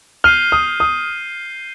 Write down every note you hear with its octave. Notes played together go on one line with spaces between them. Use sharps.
F6 G6 C7 D#7 G7
D#6
D#6